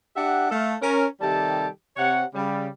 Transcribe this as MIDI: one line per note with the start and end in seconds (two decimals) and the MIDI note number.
0.16 0.50 62
0.16 0.50 67
0.16 0.50 76
0.16 0.50 78
0.50 0.75 57
0.50 0.75 69
0.50 0.75 77
0.82 1.06 61
0.82 1.06 70
1.21 1.67 48
1.21 1.67 51
1.21 1.67 55
1.21 1.67 67
1.21 1.67 69
1.21 1.67 81
1.96 2.24 48
1.96 2.24 73
1.96 2.24 78
2.34 2.67 49
2.34 2.67 55